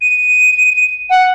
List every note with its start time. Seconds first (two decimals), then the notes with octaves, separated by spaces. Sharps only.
0.01 D#7
1.10 F#5